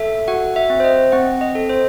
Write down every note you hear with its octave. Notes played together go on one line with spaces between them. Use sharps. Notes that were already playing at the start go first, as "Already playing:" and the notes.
Already playing: A4 E5
F#4 F#5
E5
C4
C5
D#5
C4 F#5
D#5
A4
C5